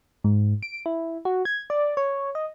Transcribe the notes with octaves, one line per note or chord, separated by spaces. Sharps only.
G#2
D7
E4
F#4
G#6
D5
C#5
D#5